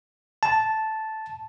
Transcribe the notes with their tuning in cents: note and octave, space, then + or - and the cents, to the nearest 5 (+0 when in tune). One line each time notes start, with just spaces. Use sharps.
A5 -5